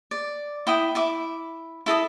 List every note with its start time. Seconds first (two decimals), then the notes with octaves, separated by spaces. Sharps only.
0.11 D5
0.67 E4 G5 D#6
0.95 E4 E5 D6
1.86 E4 A4 D#5 D#6